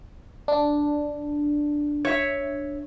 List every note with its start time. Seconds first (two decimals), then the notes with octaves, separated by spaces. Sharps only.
0.48 D4
2.05 C#5 E5